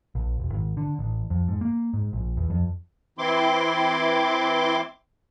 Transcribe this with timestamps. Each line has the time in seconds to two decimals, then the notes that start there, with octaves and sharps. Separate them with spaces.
0.15 A#1
0.40 E1
0.52 G#1
0.77 D3
0.99 A1
1.30 F2
1.48 G#2
1.61 A#3
1.93 G#2
2.13 A#1
2.37 E2
2.50 F2
3.18 E3 C4 E4 C6 D6